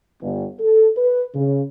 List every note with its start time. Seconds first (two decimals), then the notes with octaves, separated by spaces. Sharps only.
0.22 G1
0.60 A4
0.97 B4
1.35 C#3